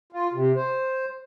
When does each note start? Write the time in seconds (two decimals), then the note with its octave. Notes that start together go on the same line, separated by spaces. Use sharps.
0.12 F4
0.33 C3
0.56 C5